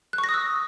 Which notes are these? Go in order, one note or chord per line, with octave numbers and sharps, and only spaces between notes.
F#6
C#6
A#6
D#6
E6